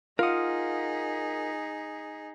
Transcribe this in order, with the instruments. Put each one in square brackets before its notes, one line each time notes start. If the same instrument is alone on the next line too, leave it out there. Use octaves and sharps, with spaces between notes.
[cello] D#4 G#4 [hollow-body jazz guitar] F4 [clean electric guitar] A#4 F#5 [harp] F5 D#6